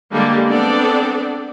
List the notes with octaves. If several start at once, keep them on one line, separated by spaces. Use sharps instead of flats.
D3 G3 G#3 A#3 G4
B3 C4 D4 A4 D5